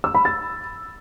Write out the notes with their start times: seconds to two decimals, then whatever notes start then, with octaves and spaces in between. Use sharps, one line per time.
0.04 E6
0.15 B5
0.25 A6